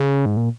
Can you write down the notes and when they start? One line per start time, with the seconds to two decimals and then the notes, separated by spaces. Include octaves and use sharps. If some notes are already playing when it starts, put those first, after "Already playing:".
Already playing: C#3
0.26 G#2
0.37 A#2